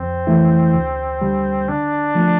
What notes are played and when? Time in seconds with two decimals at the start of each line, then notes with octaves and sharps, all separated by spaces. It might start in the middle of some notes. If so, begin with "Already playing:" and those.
Already playing: F2 C4
0.27 E3 A3 E4
0.74 D2
1.21 D3 G3
1.68 D3 D4
2.15 F3 A3